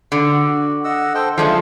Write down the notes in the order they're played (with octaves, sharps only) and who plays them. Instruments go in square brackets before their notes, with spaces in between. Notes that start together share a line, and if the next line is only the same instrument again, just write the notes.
[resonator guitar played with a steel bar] D3
[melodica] F#4
D#5 F#5 E6
A4 C5 G5
[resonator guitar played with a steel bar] F3 G#3 A3 [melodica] D4 A4